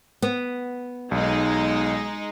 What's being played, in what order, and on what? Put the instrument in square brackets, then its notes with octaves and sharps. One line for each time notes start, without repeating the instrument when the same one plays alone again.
[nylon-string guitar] B3
[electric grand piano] B1 [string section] G#3 D#4